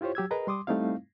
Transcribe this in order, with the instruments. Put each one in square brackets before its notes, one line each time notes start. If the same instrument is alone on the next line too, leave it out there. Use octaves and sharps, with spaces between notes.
[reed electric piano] E4 F4 G4 C5 C#5
F#3 G4 E6 G#6
G#4 A#4 B4 D#5 A#5
G3 C6 D6 D#6
G3 A3 C4 D#4 E4 F5